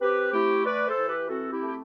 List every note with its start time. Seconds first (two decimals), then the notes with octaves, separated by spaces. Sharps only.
0.01 C4 G4 B4
0.33 A3 E4 G4
0.65 E3 B4 D5
0.87 A4 C5
0.98 E3
1.08 G4 B4
1.29 C4 F#4 A4
1.52 E4 G4
1.63 A3 G4